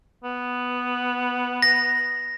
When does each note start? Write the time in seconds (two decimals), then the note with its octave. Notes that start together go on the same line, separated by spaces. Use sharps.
0.24 B3
1.62 A#6